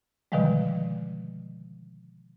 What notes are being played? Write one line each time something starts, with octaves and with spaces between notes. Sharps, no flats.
B2 D3 D#3 F3 G3 G#3